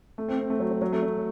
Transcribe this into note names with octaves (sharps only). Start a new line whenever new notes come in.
A3
C4
C4
A3
F#3
F#3
F#3
A3
F#3